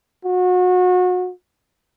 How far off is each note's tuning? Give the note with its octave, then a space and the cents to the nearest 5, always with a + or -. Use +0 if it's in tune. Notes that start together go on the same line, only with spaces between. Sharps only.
F#4 -30